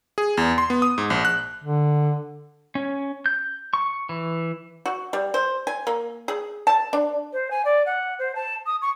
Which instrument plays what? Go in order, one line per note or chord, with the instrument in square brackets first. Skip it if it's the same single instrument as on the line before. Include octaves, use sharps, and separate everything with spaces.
[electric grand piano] G#4
E2
C6
B3
D#6
G#2
A#1
F#6
[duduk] D3
[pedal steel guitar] C#4
G6
C#6
E3
[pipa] F#4
G3
C5
G#5
A#3
G#4
A5
D4
[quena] C5
G#5
D5
F#5
C5
A5
D#6
C#6